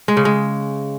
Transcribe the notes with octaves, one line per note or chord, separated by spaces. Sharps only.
G#3
C#3
G#3